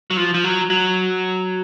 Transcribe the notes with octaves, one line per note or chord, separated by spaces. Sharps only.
F#3
F3
F3
F#3
F#3